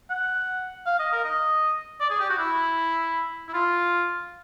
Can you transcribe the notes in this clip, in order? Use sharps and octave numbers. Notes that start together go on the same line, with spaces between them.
F#5
F5
D#5
A#4
D#5
D5
G#4
G4
F#4
E4
E4
F4